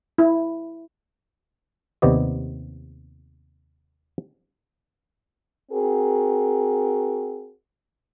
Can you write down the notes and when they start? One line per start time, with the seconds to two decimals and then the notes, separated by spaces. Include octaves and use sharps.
0.18 E4
2.02 D#2 C3 B3 D5 D#5
5.72 C4 F#4 G#4 A#4